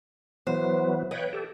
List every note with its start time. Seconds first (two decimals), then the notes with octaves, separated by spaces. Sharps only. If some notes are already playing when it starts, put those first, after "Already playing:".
0.47 E3 F#3 B3 C5
1.11 B4 C#5 D#5 G5
1.33 G4 A4